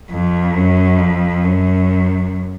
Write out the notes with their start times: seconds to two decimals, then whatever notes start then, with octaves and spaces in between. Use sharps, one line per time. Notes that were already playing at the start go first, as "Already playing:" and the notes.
0.10 F2
0.54 F#2
0.99 F2
1.44 F#2